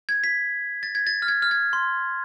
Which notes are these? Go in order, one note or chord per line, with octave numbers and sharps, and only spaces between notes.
G#6
B6
A6
G#6
A6
F6
G#6
F6
G#6
C6